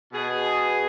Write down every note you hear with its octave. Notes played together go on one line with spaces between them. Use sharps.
B2 G#4